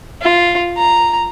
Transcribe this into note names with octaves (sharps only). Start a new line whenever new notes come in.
F4
A#5